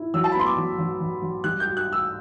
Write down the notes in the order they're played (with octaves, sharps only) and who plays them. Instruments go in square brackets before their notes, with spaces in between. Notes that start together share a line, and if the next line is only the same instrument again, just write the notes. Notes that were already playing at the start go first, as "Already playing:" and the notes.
Already playing: [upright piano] E4
[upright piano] F#3 [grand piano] E6
[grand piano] A5
B5
[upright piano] B3 [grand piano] C6
[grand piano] D6
[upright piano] F#3
F#3
F#3
F#3
[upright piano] G3 [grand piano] F#6
[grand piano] G6
[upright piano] F#4
[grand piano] F#6
[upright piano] F#4
[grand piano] E6